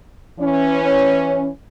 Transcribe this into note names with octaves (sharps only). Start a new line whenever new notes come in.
E3 C#4